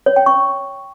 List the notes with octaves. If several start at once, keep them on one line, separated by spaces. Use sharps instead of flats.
C#5
G5
C#6